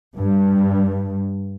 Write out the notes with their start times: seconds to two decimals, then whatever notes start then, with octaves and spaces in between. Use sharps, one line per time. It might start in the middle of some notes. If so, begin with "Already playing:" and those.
0.17 G2